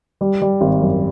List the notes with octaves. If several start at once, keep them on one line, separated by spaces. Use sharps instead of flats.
G3
G3
G#1
F#2